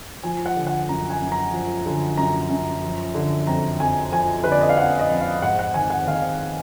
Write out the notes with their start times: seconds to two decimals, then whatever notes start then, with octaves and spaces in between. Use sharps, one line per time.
0.23 F3 G#5
0.46 F#5
0.56 D3
0.67 F#5
0.89 F#2 A#5
1.10 G#5
1.21 F#2
1.32 A#5
1.53 F3
1.86 D3
2.17 F#2 A#5
2.50 F#2
2.83 F3
3.15 D3
3.47 F2 A#5
3.80 F2 G#5
4.12 F3 G#5
4.44 D3 B4
4.52 D5
4.61 D#5
4.69 F5
4.77 F2 F#5
4.99 D#5
5.09 F2
5.21 F5
5.42 G#2 F#5
5.59 F#5
5.74 D#3 G#5
5.90 F#5
6.07 D#3 F5